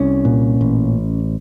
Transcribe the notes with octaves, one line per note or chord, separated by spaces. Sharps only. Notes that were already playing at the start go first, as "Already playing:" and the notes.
Already playing: C2 C#4
A#2
A1